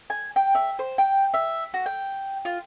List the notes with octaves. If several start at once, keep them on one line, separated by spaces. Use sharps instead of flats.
G#5
G5
E5
C5
G5
E5
F#4
G5
F4